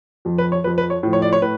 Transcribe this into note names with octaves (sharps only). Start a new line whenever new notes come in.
F2 F3
B4
C#5
F2 F3 B4
B4
C#5
A2 F3
C#5
D5
C#5
A2 B4